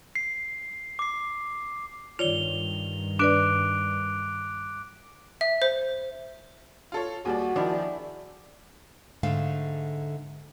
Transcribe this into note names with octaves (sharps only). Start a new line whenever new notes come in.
C7
D6 C7
G2 D#3 F4 C#5 D5 F7 G7
D4 B4 D5 D6 F#6 D7
E5
C5
F4 A4 C#5
D#2 G3 F#4 G#4 D5
D#3 F3 D4 E4
G#2 D3 A3 F5